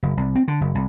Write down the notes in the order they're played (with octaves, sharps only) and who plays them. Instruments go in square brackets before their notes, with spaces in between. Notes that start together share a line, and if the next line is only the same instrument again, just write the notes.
[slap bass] F#1
C2
C4
D3
F#1
C2